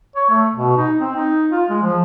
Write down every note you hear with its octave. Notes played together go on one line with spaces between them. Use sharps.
C#5
A3
B2
D#4
C4
D#4
F4
G#3
F3